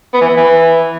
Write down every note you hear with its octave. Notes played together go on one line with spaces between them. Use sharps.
B3
E3
B3
E3